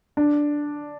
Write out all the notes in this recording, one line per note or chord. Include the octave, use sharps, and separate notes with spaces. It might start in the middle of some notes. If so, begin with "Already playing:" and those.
D4